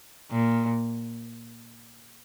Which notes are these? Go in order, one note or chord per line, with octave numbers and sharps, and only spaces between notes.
A#2